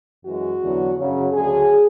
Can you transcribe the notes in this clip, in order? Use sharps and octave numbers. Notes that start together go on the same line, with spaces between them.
F#2 E3 G#3 F#4
E2 D3 F#3
F#2 C#3 F#3
D2 D3 F#3 G#4